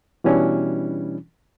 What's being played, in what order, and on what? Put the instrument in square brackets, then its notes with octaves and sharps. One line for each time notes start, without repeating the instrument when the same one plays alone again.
[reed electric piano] B2 E3 G3 C#4 D4 E4